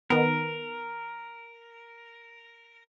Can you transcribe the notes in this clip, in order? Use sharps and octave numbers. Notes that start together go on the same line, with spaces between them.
D#3 B3 A#4